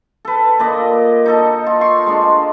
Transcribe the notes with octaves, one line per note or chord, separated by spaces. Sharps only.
A4 B4
A#2 D5 D#5
D#4 A4 D#5
F4
C6 C#6
G#3 D4